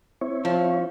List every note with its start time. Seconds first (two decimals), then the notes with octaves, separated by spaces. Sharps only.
0.21 C4 E4 C#5
0.45 F3